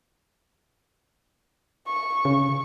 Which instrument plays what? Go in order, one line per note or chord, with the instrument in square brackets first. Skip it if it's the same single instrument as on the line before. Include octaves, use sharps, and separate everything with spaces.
[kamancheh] C#6
[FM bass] C#3